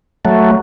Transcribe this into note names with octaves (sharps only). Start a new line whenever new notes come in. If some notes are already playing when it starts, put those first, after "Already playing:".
F#3 A3